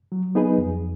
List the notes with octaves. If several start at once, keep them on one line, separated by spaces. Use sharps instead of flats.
F#3
B3 D#4 G#4 B4
F2